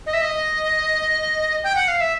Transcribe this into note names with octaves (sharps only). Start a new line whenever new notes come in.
D#5
E5
D#5
G5
F#5
F5
E5